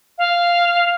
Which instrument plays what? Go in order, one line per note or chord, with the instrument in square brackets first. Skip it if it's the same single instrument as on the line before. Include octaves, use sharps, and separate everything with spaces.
[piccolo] F5